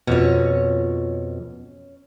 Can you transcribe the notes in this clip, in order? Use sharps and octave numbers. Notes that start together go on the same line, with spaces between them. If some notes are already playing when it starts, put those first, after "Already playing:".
F2 B2 C#4 C#5